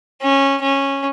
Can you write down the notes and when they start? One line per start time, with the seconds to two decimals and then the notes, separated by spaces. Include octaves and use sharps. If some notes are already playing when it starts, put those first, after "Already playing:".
0.21 C#4
0.61 C#4